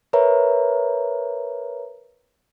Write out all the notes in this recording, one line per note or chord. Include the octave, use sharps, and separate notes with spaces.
A#4 B4 C#5 E5 A#5